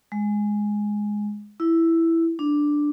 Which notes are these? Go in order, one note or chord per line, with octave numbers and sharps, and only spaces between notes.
G#3
E4
D4